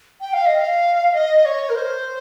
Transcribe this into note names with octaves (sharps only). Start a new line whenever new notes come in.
G5
F5
D#5
F5
D#5
C#5
A#4
C5